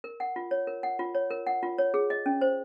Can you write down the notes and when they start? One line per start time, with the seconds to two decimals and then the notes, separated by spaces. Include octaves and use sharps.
0.04 A#4
0.20 F#5
0.36 F4
0.51 C#5
0.67 A#4
0.83 F#5
0.99 F4
1.15 C#5
1.31 A#4
1.47 F#5
1.63 F4
1.78 C#5
1.94 G#4
2.10 D#5
2.26 C#4
2.41 C5